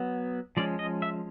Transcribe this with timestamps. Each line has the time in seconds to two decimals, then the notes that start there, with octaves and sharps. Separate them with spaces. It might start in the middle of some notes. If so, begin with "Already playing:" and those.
Already playing: F#3 B3
0.57 F3 G#3 C#4 D5
0.79 D#5
1.02 E5